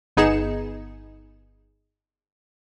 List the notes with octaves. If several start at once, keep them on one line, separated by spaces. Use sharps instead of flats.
G1 B3 D#4 G#4 C#7 E7